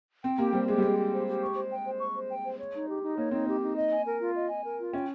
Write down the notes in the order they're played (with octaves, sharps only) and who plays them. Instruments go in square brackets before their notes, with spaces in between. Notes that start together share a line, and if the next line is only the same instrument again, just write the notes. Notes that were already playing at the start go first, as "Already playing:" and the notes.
[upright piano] C4 [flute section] G5
[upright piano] A#3 [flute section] G4
[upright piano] G3 [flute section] C5
[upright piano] G#3 [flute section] G4
[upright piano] G3
[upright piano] G#3 [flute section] G5
[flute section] G4
C5
G4
C#6
C5
G5
C5
C#6
C5
G5
C5
C#5
D#4
G4
D#4
[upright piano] A#3 [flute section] C#5
[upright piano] C4 [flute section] D#4
[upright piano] A#3 [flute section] G4
[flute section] D#4
D#5
G#5
A#4
F4
D#5
G#5
A#4
F4
[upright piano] C#4 [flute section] G5